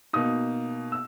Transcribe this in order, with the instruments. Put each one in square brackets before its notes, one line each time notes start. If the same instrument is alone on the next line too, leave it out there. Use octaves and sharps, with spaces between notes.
[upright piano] B2 A#3 D#4 D#6
E6